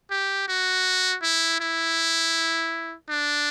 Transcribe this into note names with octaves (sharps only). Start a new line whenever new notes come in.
G4
F#4
E4
E4
D4